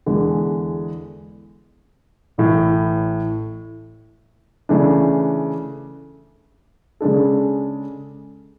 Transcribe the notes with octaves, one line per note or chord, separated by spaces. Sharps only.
E2 D3 G#3
A1 A2 E3
C#3 E3 A3 D4
C#3 G#3 D4 A4